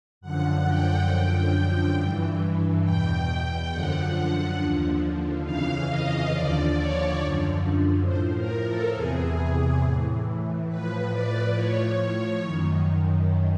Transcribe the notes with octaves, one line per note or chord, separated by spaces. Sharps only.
F#2 D3 F3 F#5
G5
F#2 D3 F3
G2 E3
E2 B2 G5
F#2 D3 F3 F#5
D#2 D3 F3
F2 C#3 E3 F5
D#5
D#2 D3 F3 D5
C#5
F#2 D3 F3
A2 F3 C5
A#4
A4
E2 C3 E3 G#4
A2 E3
A2 F3 B4
D5
A2 F3 C#5
F#2 D#3